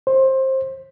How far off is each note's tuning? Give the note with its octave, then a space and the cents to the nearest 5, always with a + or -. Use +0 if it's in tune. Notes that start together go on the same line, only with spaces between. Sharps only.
C5 +20